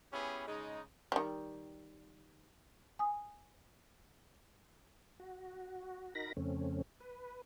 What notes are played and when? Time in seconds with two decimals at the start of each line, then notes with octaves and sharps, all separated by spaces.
0.13 B3 C#4 E4 G4 G#4
0.47 C#3 G#3 D#4
1.12 D#3 G3
2.99 G#5 D#6
5.20 F#4
6.15 D#4 F#4 A#4 B5 A#6
6.37 F2 C#3 A3 C4 C#4
7.00 B4